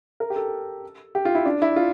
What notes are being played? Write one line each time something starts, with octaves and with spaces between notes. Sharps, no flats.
A#4
G4
A4
G4
F4
E4
D4
E4
F4